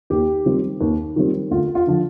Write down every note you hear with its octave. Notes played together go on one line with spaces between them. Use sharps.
D#2 G4
D#3 G3 C4
D#2
D#3 G3 C4
D2 F4
F4
D3 F3